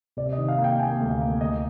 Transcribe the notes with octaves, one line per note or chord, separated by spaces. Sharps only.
C3 D5
D#5
D#3
F5
A#3
G5
A#3 G#5
D2
F5
A#3
D2 D#5